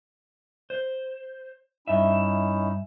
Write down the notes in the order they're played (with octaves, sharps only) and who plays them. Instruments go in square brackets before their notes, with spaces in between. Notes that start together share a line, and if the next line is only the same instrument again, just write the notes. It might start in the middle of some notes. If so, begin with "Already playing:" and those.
[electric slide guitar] C5
[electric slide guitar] G2 E5 [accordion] C#4 D#4 E4